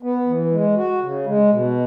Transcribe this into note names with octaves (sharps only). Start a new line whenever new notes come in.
B3
E3
G#3
F#4
C#3
G#3
B2